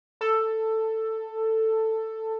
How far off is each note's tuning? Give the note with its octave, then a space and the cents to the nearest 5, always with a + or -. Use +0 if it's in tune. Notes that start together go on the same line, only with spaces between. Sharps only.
A4 +10